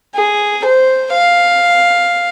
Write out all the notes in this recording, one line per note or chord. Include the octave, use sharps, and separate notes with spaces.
G#4
C5
F5